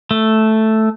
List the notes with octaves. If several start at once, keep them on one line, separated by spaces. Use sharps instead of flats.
A3